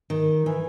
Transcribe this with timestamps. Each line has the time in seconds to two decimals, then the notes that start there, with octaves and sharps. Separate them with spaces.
0.10 D#3
0.46 E3